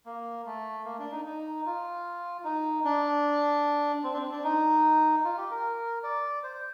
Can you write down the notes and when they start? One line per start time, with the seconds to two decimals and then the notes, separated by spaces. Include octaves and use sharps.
0.06 A#3
0.46 A3
0.85 A#3
0.99 D4
1.12 D#4
1.26 D#4
1.66 F4
2.44 D#4
2.84 D4
4.04 C4
4.14 D4
4.18 C4
4.31 D4
4.44 D#4
5.24 F4
5.37 G4
5.51 A#4
6.03 D5
6.43 C5